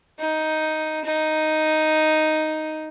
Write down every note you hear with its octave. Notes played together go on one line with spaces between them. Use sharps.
D#4
D#4